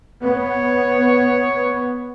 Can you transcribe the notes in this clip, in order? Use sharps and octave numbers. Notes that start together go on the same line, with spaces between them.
B3 C#5